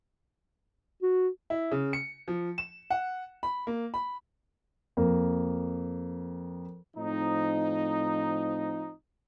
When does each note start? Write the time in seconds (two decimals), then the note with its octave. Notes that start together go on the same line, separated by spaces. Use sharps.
1.02 F#4
1.50 E4
1.71 C#3
1.93 C#7
2.28 F3
2.58 E7
2.90 F#5
3.43 B5
3.67 A#3
3.94 B5
4.97 F2 A#3
6.96 A2 F3 C4 D#4